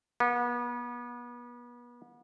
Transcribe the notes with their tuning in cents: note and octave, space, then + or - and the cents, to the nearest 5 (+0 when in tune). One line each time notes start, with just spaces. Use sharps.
B3 -35